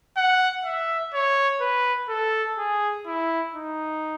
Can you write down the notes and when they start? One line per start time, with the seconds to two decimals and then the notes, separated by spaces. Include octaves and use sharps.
0.17 F#5
0.65 E5
1.14 C#5
1.61 B4
2.09 A4
2.58 G#4
3.07 E4
3.54 D#4